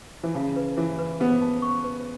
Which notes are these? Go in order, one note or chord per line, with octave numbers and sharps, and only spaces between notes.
E3
C#3 A5
B4
E3 B4
B4
B3 B4
A5
C#6
B4